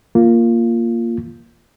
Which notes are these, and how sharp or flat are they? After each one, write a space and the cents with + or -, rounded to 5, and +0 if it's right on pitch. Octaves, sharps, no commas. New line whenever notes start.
A#3 +0 F4 -5